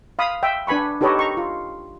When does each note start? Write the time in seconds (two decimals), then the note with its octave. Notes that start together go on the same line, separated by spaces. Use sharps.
0.19 F5 B5 D#6
0.43 E5 G5
0.67 D4 B4 G#5 B5 C#6
1.01 D#4 G4 A4 B4 C#5 D#5
1.19 A#5 C#6
1.37 F4